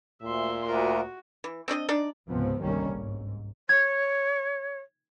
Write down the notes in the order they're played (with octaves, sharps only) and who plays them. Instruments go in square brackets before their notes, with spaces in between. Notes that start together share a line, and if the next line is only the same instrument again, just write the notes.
[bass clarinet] D2 [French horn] A#2 [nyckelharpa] E5 C6
[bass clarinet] D2 [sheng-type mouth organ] F4 A#4 [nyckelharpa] F#4
[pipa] E3
C4 D4 D5 D#5
D4 D#4 D5
[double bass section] C#2 G#2 C3 F3 B3 C4
G1 C2 D#3 G3 A#3 C#4
G#2
[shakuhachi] C#5 [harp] G#6